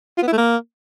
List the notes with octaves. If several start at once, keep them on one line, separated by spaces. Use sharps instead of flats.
F4
B3
E4
A3
A#3